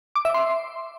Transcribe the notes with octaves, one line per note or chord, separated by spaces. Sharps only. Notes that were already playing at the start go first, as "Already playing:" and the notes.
D6
E5
C6